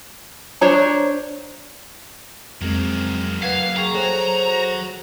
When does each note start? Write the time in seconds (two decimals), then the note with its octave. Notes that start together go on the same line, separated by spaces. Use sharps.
0.61 D4 C5 C#5 A#5
2.61 F2 F#3 G#3 A#3 C4
3.43 B4 F5 F#5 G#6 C7
3.77 G#4 G5 A#5 C#6 G#6
3.94 F#3 F#4 G#4 A4 C5 C#5